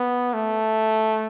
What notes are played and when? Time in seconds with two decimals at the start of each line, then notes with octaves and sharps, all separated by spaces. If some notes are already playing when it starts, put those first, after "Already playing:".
Already playing: B3
0.34 A3